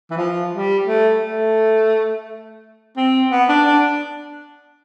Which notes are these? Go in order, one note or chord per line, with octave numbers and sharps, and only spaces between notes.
E3
F3
G3
A3
A3
C4
B3
D4
D4